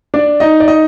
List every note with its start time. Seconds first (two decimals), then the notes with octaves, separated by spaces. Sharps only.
0.14 D4 D5
0.40 D#4 D#5
0.60 D5
0.68 D#4 D#5